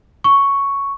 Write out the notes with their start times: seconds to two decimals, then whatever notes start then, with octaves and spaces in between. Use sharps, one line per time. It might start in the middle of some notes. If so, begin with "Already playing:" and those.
0.24 C#6